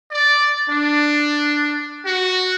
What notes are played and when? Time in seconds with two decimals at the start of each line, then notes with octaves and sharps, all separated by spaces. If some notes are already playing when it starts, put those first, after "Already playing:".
0.10 D5
0.67 D4
2.04 F#4